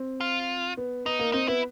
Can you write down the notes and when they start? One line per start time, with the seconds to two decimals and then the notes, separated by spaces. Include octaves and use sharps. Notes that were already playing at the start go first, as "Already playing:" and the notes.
Already playing: C4
0.21 F4
0.77 B3
1.06 B3 D#4
1.19 A#3
1.33 C4 D#4
1.48 B3 E4